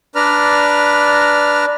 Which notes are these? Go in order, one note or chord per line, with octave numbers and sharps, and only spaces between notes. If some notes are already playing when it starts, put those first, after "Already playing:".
D4 B4 D5 A#5 F6